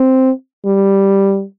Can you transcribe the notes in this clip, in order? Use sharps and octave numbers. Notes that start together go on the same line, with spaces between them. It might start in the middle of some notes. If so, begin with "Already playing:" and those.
Already playing: C4
G3